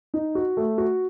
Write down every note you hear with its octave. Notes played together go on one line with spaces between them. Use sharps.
D#4
F#4
A3
F#4